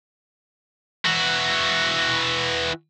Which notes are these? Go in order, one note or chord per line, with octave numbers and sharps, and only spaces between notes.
E3 F#4